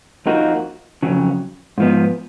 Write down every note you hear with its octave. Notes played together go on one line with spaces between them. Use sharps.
F2 F3 A#3 D#4 F#4
F2 C#3 F#3
G#2 F3 B3